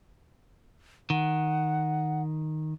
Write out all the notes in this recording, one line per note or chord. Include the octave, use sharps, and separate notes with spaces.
D#3 F#5